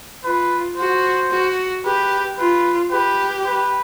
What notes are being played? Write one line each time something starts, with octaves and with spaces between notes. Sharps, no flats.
F4 B4
F#4 C5
F#4
G4 B4
F4 B4
G4 B4
B4